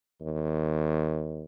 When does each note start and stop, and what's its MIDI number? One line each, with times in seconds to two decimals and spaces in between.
0.21 1.44 39